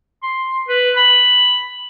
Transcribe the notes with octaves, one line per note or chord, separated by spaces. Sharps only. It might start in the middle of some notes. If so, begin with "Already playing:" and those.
C6
B4
B5